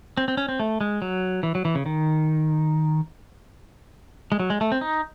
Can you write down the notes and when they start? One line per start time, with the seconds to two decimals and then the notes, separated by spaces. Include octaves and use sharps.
0.17 C4
0.28 C4
0.37 C#4
0.49 C4
0.60 A3
0.81 G#3
1.02 F#3
1.43 E3
1.55 F#3
1.65 E3
1.75 C#3
1.86 D#3
4.32 G#3
4.40 F#3
4.50 G#3
4.61 A3
4.72 C4
4.81 D#4